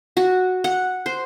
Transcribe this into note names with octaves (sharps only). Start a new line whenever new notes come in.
F#4
F#5
C5